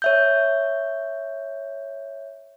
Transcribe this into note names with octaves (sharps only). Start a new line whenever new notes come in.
C#5 E5 G6